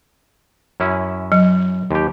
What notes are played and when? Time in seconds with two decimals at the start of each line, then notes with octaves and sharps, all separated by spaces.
0.80 F#2 C#4 E4
1.32 F#3
1.91 D#2 G4